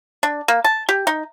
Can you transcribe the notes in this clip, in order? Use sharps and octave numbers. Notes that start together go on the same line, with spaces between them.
D4
A#3
A5
G4
D#4